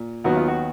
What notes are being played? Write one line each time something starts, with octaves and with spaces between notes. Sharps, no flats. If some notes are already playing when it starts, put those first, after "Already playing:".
Already playing: A#2
D#2 D#3 F#3 B3 F#4
F4
F#4